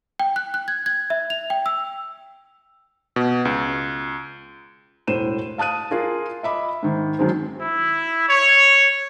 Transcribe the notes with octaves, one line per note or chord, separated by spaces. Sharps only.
G5
F#6
F#6
G#6
G#6
E5
F7
G5
E6
B2
C#2
E1 A2 C5 D#7 E7
F5 A5 D#6 F#6 D#7
F4 G#4 A#4
D#5 E5 B5 D6
G#2 D#3
F#2 D#3 G#3 C4
E4
C#5